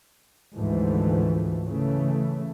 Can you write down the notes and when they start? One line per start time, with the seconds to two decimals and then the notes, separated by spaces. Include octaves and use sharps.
0.56 D2 G#2 E3 F3 A3
1.68 C#3 E3 A3